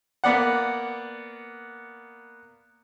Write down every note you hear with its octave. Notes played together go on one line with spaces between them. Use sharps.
A#3 B3 D5 F#5